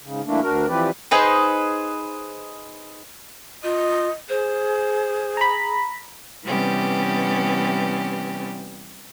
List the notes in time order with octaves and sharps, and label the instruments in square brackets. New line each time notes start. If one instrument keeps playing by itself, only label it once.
[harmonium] G#2 C#3
G2 E3 A3 A#3 D4
D2 D4 F#4 A#4
E3 F3 C4 G4 B4 D5
[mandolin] D#4 G#4 B4 C5
[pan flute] F4 [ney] D#5
[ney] G#4 [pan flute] C5
[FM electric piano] A#5 B5
[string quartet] C3 E3 G3 B3 C#4 G4